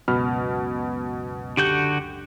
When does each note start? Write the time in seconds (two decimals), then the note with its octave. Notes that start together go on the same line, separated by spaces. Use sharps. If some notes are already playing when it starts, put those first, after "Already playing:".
0.08 C#2 F#2 B2 B5 F6
1.57 D3 F#4 G4 G6